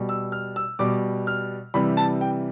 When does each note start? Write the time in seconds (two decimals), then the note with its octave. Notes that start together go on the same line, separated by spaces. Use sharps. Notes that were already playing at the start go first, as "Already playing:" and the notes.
Already playing: B2 G3
0.09 E6
0.32 F6
0.56 E6
0.79 B2 G3 D6
1.27 F6
1.74 C3 E3 G3 B5
1.97 A5
2.21 G5